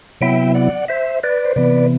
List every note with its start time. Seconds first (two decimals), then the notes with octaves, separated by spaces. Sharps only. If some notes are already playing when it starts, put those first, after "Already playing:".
0.21 C3 F#3 B3 E4 E5 G5
0.55 D5 F#5
0.88 C5 E5
1.23 B4 D5
1.45 C5
1.56 C3 E3 B3 B4 D5